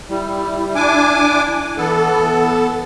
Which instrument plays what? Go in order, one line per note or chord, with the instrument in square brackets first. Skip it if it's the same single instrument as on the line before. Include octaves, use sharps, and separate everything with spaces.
[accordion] G3 [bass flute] E4
[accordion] D4 G#5 D6
[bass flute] E3 [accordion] B3 A4